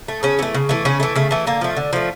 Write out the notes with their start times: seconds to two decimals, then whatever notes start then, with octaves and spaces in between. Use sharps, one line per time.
0.08 A3
0.23 C#3 C#4
0.39 E3 A3
0.54 C#3
0.69 E3 A3
0.85 C#3 C#4
1.00 E3 A3
1.16 C#3 A3
1.31 E3 A3
1.47 D3 A#3
1.61 F3 A3
1.77 D3
1.93 F3 A3